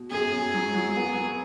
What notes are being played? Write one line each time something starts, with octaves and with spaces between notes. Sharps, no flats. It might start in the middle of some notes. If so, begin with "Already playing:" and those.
Already playing: B2
F#2 G#4
F#2
F#3
F#3
B3
B3